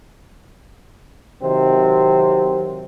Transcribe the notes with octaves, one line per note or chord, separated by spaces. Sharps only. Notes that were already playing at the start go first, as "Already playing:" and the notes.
C3 D#3 F#3 C4